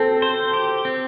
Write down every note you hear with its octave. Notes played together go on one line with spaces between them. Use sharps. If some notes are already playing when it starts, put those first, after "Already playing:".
Already playing: C4 A4
C5
G4
C4